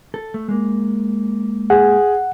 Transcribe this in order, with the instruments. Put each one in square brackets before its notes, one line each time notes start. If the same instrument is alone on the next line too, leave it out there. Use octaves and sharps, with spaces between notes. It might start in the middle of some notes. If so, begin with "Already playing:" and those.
[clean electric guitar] A4
A3
G#3 A#3
[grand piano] G#4 [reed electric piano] F#5